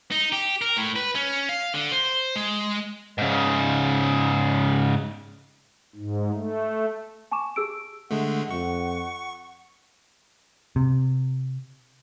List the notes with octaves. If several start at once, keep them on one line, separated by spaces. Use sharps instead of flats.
D#4
G4
A#4
A2
B4
C#4
F5
D3
C5
G#3
G#2 C#3
G#2
A3
G#5 A5 C#6 D6 E7
G4 G#4 E6 D7
D3 G#3 A3 F#5
F2 C#6
C3